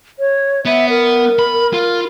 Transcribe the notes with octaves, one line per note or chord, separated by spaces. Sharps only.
C#5
B3 E5
A#4
B5
F4